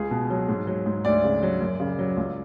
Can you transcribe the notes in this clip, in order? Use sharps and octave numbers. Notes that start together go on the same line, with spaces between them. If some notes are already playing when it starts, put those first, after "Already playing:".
Already playing: C#2 G#4
B2
F#3
G#2
F#3
G#2
D2 D5
C#3
F#3
F#2
C#3
F#3
C#2